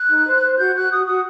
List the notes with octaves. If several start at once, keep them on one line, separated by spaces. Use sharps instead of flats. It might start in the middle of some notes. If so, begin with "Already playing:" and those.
Already playing: F#6
D#4
C5
C5
F#4 G6
F#4 F#6
F#4 D#6
F#4 D#6